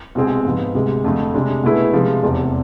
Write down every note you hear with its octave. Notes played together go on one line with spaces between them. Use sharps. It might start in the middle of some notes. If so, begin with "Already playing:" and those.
C2 B2 G#3 C4 G#4
G#2 F3 B3
D2 C3 G#3
F2 D3 F3 A3
C3 G#3 D4 G#4
B2 A3 E4 G#4 B4
C3 F3 G#3
F1 E2 C3